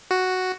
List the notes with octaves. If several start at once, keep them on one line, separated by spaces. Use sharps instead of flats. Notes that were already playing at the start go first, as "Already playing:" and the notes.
F#4